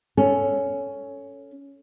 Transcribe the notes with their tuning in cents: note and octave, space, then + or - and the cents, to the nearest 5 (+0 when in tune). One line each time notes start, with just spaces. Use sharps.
C#4 +10 A4 +0